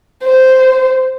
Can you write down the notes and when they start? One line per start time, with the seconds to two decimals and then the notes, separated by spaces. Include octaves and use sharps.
0.23 C5